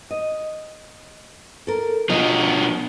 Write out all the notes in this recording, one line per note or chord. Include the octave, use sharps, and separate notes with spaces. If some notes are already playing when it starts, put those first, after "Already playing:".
D#5
A4 A#4
B2 F3 C#4 D#5